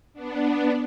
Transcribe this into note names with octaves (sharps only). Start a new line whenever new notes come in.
B3 D4